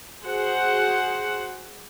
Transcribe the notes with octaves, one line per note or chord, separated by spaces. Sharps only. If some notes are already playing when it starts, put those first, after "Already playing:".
F#4 G#4 C5 F#5